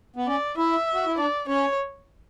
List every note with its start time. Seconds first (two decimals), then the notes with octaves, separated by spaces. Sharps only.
0.16 B3
0.27 C#4 D5
0.57 E4 E5
0.94 F#4
1.06 E4
1.17 D4 D5
1.48 C#4 C#5